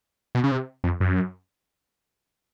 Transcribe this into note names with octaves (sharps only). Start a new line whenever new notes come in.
B2
C#3
C3
F2
F#2